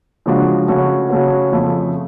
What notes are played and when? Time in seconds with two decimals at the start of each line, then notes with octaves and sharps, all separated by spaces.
0.26 C#3 F3 G#3 D4 F#4
0.68 C#3 F#3 A3 C#4 F#4
1.09 C#3 F#3 A3 C#4 F#4
1.52 F2 C#3 F3 A3